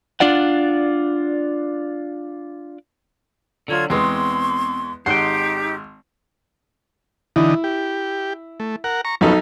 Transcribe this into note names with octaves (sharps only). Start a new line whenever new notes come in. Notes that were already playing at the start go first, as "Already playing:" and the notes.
D4 F4 D5 F#5
D3 F#3 F4 G#6
E2 G#3 B3 C4 C6 C#6
G#1 D#4 G4 C5 F#5 G5 C6
D3 E3 D#4 E4
G4
A3
A#4 F#5
A#5 C#6
B1 F3 B3 C#4 D#4 A4